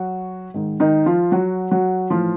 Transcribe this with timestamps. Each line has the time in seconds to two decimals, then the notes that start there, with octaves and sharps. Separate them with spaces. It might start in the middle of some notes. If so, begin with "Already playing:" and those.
Already playing: F#3 F#4
0.54 G#2 D#3
0.80 D#3 D#4
1.06 F3 F4
1.32 F#3 F#4
1.71 F#3 F#4
2.10 A2 E3 F3 F4